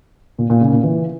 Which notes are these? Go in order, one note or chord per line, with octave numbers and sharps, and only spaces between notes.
A#2
A#2
C#3
A#2
E3